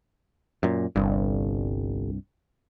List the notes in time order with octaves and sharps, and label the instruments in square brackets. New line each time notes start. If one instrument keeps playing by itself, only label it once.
[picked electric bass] F#2 A#2
[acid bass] G1 [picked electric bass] C2 G2